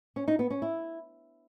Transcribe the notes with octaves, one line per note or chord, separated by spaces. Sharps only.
C#4
D#4
B3
C#4
E4